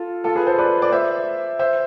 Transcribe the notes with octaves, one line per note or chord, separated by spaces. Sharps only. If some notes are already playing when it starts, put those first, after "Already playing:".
Already playing: F4 A4
F4 A4
G#4 B4
A4 C5
B4 D5
D5
C5 E5
C5 E5